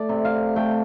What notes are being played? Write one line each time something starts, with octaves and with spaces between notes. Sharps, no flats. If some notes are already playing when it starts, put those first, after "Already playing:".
Already playing: A3 D5
C3
F5
A3 G5